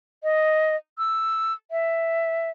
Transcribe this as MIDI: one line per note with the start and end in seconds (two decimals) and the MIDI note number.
0.23 0.76 75
0.98 1.53 88
1.71 2.50 76